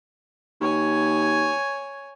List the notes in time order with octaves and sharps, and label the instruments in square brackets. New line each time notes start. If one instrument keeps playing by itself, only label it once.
[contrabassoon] D#2 [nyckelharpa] C#5 G#5